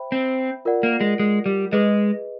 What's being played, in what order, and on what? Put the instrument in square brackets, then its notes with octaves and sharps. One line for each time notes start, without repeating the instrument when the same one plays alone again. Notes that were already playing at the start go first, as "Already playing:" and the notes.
Already playing: [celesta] C5 E5 G5 B5
[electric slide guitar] C4
[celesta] F4 A#4 D5 F#5
[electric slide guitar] A#3
G#3
G#3
G3
[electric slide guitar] G#3 [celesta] G#4 B4 D#5